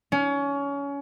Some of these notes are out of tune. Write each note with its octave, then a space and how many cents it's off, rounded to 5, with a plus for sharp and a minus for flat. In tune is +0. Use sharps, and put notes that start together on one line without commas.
C#4 +25